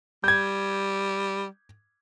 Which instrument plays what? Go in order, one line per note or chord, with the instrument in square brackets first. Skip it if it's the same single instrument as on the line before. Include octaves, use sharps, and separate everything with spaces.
[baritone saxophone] G3 [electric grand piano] G6 G#6